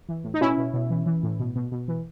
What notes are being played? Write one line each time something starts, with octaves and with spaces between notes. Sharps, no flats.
E3
A2
D#4
B2 C#4 E4
B2
B2
E3
E3
A2
B2
B2
B2
E3